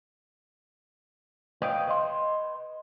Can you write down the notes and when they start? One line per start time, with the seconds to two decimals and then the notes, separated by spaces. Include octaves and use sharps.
1.62 B4 C#5 D#5 F5 G5
1.87 B4 D#5 C6